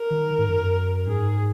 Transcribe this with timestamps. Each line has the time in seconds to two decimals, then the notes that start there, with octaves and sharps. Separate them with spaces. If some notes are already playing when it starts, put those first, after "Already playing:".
Already playing: A#4
0.11 D#3
0.39 G#2
0.49 F#2
1.06 G#2 G#4